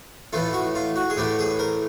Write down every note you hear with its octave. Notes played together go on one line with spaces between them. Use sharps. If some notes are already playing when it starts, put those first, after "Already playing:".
A2 E3 A3 F4
F#4
F4
F#4
G#4
A2 E3 A3 G4
G#4
A#4